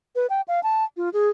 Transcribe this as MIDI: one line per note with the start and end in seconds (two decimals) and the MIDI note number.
0.16 0.27 71
0.30 0.41 79
0.48 0.63 77
0.63 0.84 81
0.97 1.09 65
1.13 1.29 68